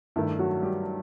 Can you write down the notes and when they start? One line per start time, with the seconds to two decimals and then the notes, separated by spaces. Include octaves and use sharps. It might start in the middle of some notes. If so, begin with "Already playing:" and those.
0.16 G2 D#3 A3 E4
0.39 F#3 F#4
0.63 G3 G4